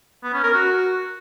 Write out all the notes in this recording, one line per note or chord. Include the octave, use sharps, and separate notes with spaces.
B3
C#4
A#4
F#4